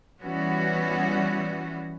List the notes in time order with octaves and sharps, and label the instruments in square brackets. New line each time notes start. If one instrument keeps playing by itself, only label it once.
[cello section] E3 G3 B3 C#4 F#4